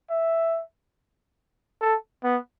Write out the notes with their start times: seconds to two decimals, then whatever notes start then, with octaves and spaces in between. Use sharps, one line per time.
0.10 E5
1.81 A4
2.24 B3